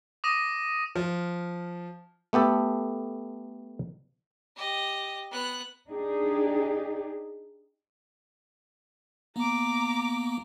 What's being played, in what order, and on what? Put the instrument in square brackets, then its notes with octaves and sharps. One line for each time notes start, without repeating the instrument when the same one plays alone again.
[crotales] D6 D#6 A#6 D#7
[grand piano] F3
[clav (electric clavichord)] A3 B3 G4 A4
[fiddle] G4 D#5
B3 F#6
[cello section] D4 D#4 G4 G#4
[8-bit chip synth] A#3 B3 [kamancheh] A#5 D6